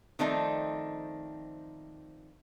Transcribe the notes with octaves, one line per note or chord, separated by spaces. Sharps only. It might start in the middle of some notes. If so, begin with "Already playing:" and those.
D#3 F3 A3 C4 D4 D#4